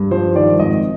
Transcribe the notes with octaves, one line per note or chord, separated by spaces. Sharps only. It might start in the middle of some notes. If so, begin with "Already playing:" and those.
Already playing: G2
F3 C5
D#3 D5
G#1 D#5